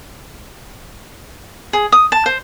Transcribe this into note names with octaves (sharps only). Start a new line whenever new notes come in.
G#4
D#6
A5
C5